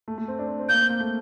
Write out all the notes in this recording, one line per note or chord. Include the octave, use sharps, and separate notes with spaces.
A3
A3
C4
D4
C4
C4
A#3 G6
C4
A#3
A3